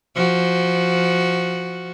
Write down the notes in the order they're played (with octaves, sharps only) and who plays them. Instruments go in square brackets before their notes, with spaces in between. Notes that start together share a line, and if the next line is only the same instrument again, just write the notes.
[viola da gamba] F3 F#4